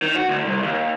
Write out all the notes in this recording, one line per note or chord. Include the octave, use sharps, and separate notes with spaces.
D#3
F#4
D2
C2
D#2